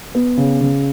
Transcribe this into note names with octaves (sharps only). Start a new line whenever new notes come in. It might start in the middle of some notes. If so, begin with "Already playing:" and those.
B3
C#3
C#3